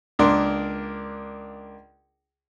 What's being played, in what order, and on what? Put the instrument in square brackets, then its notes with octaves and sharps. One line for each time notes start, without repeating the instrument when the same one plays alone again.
[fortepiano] C#2 A#3 D4 A#4 C6